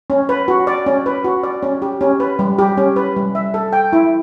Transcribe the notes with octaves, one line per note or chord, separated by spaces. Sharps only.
C#4
B4
F#4
D5
C#4
B4
F#4
D5
C#4
G4
C#4
B4
G3
G4
C#4
B4
G3
E5
A4
G5
E4